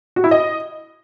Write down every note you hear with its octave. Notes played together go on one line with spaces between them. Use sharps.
F#4
E4
D#5